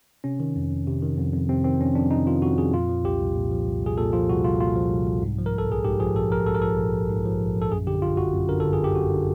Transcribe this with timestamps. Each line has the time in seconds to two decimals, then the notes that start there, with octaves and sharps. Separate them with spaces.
0.24 C3 C#4
0.40 D#3
0.56 F2
0.71 F2
0.87 C3
1.02 D#3
1.17 F2
1.33 F2
1.49 C3 C4
1.65 D#3 C4
1.79 F2 C#4
1.95 F2 D4
2.11 C3 D#4
2.27 D#3 F4
2.42 F2 F#4
2.58 F2 G#4
2.73 A#2 F4
2.89 F3
3.04 C2 G4
3.20 C2
3.35 A#2
3.51 F3
3.67 C2
3.83 C2 G#4
3.98 A#2 A4
4.13 F3 F4
4.29 C2 F#4
4.44 C2 F4
4.60 A#2 F4
4.76 F3
4.91 C2
5.07 C2
5.23 G#2
5.38 F3
5.46 A#4
5.53 A#1 A4
5.69 A#1 G#4
5.84 G#2 G4
6.00 F3 G#4
6.15 A#1 A4
6.31 A#1 A#4
6.46 G#2 A4
6.55 A#4
6.62 F3 A4
6.79 A#1
6.94 A#1
7.09 G#2
7.25 F3
7.40 A#1
7.56 A#1
7.62 A4
7.71 F#2 G#4
7.87 D3 G4
8.02 G1 F4
8.17 G1 F#4
8.33 F#2
8.49 D3 A#4
8.60 G1 A4
8.73 G#4
8.81 G1 G4
8.95 F#2 F#4
9.11 D3